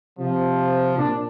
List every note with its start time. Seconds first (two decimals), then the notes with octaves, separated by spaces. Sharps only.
0.19 C3 F3
0.98 A#2 D4